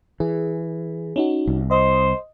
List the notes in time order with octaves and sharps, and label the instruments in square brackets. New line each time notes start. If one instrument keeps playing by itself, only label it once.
[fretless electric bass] E3 [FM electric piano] G#4
[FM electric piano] C#4 D#4 F#4
[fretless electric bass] C2
[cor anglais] C5 [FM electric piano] D#5